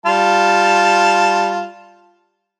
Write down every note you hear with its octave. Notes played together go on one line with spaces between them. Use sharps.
G3 F4 A5